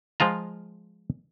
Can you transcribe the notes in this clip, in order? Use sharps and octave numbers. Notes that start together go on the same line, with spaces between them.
F3 G#3 F4 A#5